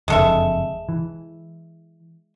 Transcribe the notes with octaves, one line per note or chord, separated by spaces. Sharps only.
F#1 F2 D3 G#3 A4 E5
E3